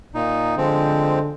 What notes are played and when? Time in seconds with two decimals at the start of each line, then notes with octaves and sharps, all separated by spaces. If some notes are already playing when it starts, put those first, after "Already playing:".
0.15 A#2 D#4
0.57 D3 F3 G#3 C4